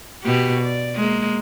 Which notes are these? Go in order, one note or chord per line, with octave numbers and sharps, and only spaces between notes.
B2 G4
D5
G#3 A#3